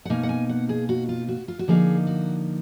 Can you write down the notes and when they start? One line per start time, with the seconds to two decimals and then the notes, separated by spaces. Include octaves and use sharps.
0.05 F#5
0.10 B2 A#3 D#4 G#5
0.23 F#5
0.29 G#5
0.49 F#5
0.69 G#4
0.89 F#4
1.09 F4
1.28 F#4
1.48 F4
1.59 F#4
1.68 D3 F3 A#3 D#4 G#4
2.07 F#4